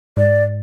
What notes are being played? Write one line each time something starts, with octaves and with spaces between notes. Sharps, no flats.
G#2 D5